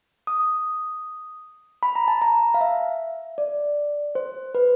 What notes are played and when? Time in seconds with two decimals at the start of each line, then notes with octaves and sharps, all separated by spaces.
0.27 D#6
1.83 B5
1.95 A#5
2.08 A5
2.22 A#5
2.54 F5
2.61 E5
3.38 D5
4.15 C5
4.55 B4